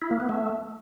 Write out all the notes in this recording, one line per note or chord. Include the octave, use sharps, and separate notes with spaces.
E4
A#3
B3
A3